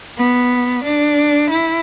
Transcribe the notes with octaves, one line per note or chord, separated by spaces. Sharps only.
B3
D4
E4